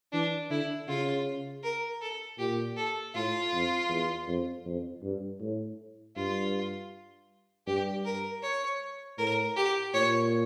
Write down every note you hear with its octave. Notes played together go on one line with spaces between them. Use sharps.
E3 D4
D3 E4
C#3 F4
A#4
A4
A#2 G4
A4
A2 F4
F2
E2
F2
F2
G2
A2
G2 F4
G2 G4
A#4
C#5
A2 A#4
G4
A#2 C#5